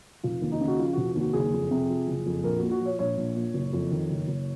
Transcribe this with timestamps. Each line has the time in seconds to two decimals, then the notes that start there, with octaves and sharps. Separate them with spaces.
0.24 F1 F4
0.42 D#2
0.52 D#4
0.61 C#3
0.68 F#4
0.79 F3 F4
0.93 F1 F#4
1.15 D#2 F#4
1.33 F#1 G#4
1.53 F2
1.71 C3
1.89 F3
2.08 F#1
2.26 F2
2.44 A#1 A#4
2.58 A#2 F#4
2.71 F#4
2.81 F3 C#5
2.99 A#1 C#5
3.17 A#1
3.36 A#2
3.54 F#1
3.73 F2
3.91 D#3
4.10 F#1
4.28 F#1